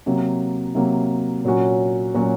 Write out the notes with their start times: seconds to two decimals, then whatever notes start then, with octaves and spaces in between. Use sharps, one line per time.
0.06 C3 F#3 A#3
0.75 C3 F#3 A#3
1.45 A#2 F#3 C#4 F#4
2.14 A#2 F#3 C#4 F#4